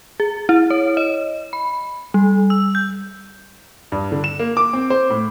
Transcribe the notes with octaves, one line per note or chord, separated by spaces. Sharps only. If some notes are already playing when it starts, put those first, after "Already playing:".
G#4
E4
C#5
D#5
B5
G3
E6
G6
G2
D3
E7
A#3
D6
C4
C5
A2